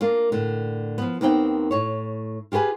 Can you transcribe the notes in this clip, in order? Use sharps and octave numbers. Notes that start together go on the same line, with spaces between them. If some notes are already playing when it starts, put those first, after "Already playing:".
A#3 D4 F4
A2 D3
F3 B3
D#2 D#3 B3 C4 D5 G5
A2 C#5
F4 G4 G#4 B4 G#5